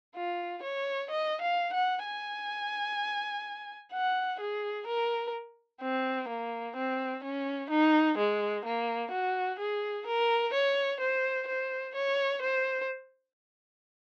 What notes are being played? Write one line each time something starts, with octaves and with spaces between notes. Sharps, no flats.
F4
C#5
D#5
F5
F#5
G#5
F#5
G#4
A#4
C4
A#3
C4
C#4
D#4
G#3
A#3
F#4
G#4
A#4
C#5
C5
C5
C#5
C5